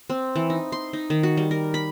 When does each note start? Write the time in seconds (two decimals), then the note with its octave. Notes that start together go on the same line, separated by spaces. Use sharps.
0.10 C4
0.36 E3
0.50 D#4
0.72 C6
0.93 D#4
1.10 D#3
1.23 F#4
1.37 G3
1.51 A#4
1.74 B5